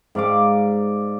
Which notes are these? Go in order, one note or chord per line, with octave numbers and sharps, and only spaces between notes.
G#2 D5 F5 D6